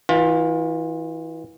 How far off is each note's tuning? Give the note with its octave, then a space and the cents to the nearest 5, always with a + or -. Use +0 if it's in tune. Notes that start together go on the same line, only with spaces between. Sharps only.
E3 -25 F4 +25